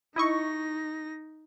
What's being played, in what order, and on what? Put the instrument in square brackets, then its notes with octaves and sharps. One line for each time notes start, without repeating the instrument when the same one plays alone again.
[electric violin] D#4 A#6 [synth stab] E4 D#5 C#6